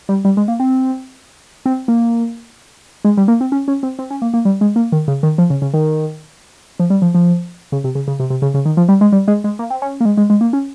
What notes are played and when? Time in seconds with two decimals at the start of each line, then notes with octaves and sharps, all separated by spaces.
0.09 G3
0.25 G3
0.37 G#3
0.48 A#3
0.60 C4
1.66 C4
1.88 A#3
3.05 G#3
3.17 G3
3.28 A#3
3.41 C4
3.52 C#4
3.68 C#4
3.83 C4
3.99 C4
4.10 C#4
4.22 A#3
4.34 A#3
4.45 G3
4.61 G#3
4.76 A#3
4.92 D#3
5.08 C#3
5.23 D#3
5.38 F3
5.50 C#3
5.62 C#3
5.74 D#3
6.79 F3
6.90 G3
7.02 F3
7.15 F3
7.72 C#3
7.84 C3
7.95 C#3
8.08 C#3
8.20 C3
8.30 C3
8.42 C#3
8.54 C#3
8.65 D#3
8.77 F3
8.89 G3
9.01 G#3
9.12 G3
9.28 G#3
9.44 G#3
9.59 A#3
9.70 C4
9.82 C#4
10.01 A#3
10.05 G#3
10.17 G#3
10.30 G#3
10.41 A#3
10.53 C#4